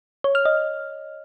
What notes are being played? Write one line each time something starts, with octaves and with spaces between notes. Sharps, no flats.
C#5
F6
D#5